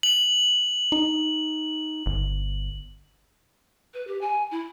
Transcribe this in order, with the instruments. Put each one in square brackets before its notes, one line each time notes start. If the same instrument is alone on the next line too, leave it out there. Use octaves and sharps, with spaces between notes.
[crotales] F#7
[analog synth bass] D#4
G1
[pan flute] B4
G4
G#5
E4